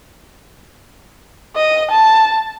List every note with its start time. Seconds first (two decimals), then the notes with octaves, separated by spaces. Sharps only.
1.56 D#5
1.91 A5